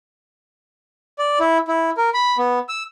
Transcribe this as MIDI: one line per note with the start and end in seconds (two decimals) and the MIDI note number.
1.19 1.39 74
1.40 1.58 64
1.68 1.90 64
1.97 2.10 70
2.14 2.37 83
2.38 2.59 59
2.69 2.83 88